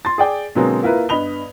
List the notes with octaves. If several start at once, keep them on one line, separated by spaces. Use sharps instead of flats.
C6 A6
G#4 D5 G5
B2 D3 F#3 G#3 A#3 C4
A#3 E4 F4 A#4 B4
G2 B3 D#5 B5 F7 G7